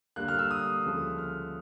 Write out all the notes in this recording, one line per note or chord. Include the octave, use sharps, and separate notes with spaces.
D3 G3 A#3 F#6
F6
E6
D#6
D2 C#3 F3 A3
F6